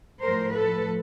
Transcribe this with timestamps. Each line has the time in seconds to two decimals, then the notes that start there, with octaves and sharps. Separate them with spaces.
0.23 A2 F3 A#4 C5
0.55 A4 B4